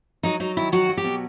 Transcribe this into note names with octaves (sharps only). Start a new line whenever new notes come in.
F#3 D#4
F#3 D#4
D#3 E4
F#3 F#4
F#3
G4
B2